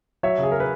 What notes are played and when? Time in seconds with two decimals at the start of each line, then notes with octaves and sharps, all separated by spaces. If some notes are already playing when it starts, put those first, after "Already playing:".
0.23 F#3 C#5 E5
0.38 C#3
0.43 G#4
0.51 A#4
0.60 B4